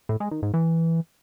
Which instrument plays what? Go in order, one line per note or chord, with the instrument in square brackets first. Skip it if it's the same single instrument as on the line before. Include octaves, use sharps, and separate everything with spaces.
[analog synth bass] A2
G#3
D#3
G#2
E3